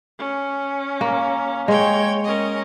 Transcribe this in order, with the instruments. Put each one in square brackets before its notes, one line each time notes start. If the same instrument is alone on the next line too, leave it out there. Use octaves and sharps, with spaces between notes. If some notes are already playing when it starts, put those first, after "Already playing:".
[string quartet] C#4
[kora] A#3
[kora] G#3 [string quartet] C#5 G5 G#6
[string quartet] C#4 A#4 D#5